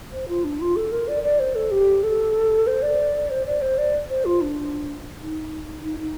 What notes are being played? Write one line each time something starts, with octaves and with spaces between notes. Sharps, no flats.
C5
F4
D4
F4
A4
A#4
D5
D5
C5
A4
G4
A4
C5
D5
C5
D5
C5
D5
C5
F4
D4
D#4
D#4
D#4